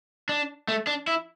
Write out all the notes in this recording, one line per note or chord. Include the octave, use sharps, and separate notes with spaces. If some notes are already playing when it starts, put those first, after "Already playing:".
D4
A3
D4
E4